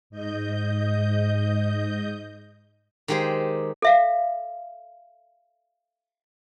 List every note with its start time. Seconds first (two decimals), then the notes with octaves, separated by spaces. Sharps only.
0.10 G#2 D#5 G6
3.08 D#3 G#3 G4 G#4 C5
3.82 A4 E5 F5